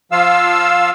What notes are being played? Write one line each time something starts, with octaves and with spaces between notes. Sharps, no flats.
F3 F4 F5 E6